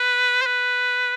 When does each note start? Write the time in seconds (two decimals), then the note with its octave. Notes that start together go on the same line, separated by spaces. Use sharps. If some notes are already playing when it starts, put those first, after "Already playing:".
Already playing: B4
0.41 C5
0.46 B4